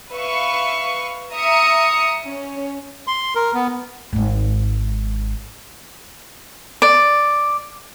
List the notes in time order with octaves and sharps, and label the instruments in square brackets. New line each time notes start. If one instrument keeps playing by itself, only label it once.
[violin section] B4 E5 F5 C#6
E5 A#5 D#6 C#7
C#4
[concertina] C6
A#4
B3
[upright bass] G#1 G#2
[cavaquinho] D5